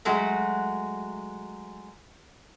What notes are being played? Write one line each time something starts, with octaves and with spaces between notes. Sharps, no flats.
F#3 G#3 A3 F#4